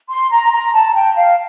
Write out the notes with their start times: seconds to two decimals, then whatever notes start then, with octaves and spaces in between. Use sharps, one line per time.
0.10 C6
0.32 A#5
0.52 A#5
0.74 A5
0.95 G5
1.16 F5